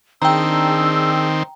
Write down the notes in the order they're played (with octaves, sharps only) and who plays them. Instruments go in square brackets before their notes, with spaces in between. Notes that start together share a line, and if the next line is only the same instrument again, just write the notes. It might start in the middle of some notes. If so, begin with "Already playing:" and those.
[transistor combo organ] D#3 C4 [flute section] D4 G#4 E6 [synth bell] G5 A#5